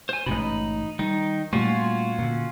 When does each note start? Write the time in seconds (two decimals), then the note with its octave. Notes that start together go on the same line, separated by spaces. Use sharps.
0.09 C5 G#5
0.26 A1 G#2 B2 D#4 B5
0.99 D#3 G3 D#4
1.53 A#2 G3 A3 C#4 F4 F#4
2.18 A#2 D3